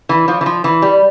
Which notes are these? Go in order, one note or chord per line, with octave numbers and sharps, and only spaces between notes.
E3
F3
E3
F3
E3
G3